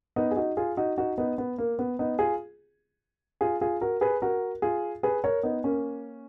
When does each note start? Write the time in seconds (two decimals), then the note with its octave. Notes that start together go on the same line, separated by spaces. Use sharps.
0.16 B3 D#4
0.31 G#4
0.37 D#4 F#4
0.57 F4 G#4
0.77 D#4 F#4
0.98 D#4 F#4
1.18 B3 D#4
1.38 B3
1.58 A#3
1.79 B3
1.99 B3 D#4
2.19 F4 G#4
3.41 F4 G#4
3.61 F4 G#4
3.81 F#4 A#4
4.01 G#4 B4
4.22 F#4 A#4
4.62 F4 G#4
5.03 G#4 B4
5.24 A#4 C#5
5.43 B3 D#4
5.64 A#3 C#4